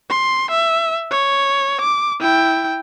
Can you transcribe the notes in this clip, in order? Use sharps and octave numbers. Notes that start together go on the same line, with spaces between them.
C6
E5
C#5
D6
E4 G5